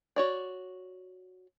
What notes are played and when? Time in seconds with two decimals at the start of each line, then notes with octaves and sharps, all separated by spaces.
0.16 F#4 C#5 D5